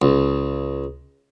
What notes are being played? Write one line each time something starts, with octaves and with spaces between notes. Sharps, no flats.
C#2